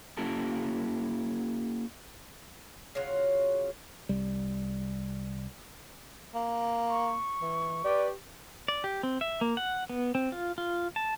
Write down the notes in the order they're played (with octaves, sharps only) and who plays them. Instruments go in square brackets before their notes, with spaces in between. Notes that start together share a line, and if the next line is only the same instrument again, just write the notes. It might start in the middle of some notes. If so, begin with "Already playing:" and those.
[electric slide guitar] A#3 C#4 E4 F#4 G#4 A5
[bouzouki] C#3 F#3 F4 F#4
[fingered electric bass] C2 G3
[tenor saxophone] A#3
[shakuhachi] C#6
[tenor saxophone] E3
[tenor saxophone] G4 [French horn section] B4 D5
[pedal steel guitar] D5
G4
C4
E5
A#3
F#5
B3
C4
F4
F4
A5